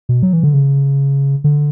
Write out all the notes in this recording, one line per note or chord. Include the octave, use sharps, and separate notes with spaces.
B2
F#3
E3
D3
C#3
D3